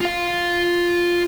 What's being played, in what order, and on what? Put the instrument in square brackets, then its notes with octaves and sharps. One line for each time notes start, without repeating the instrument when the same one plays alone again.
[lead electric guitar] F4 F5